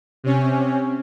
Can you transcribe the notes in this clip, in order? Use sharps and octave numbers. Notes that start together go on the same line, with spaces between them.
C3 C#4